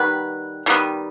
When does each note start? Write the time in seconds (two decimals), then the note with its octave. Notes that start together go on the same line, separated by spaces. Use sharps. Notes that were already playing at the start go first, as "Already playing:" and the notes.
Already playing: D#3 G3 B3 B4
0.66 D#3 G3 B3